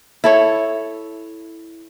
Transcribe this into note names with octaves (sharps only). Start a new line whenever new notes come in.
E4 A4 C#5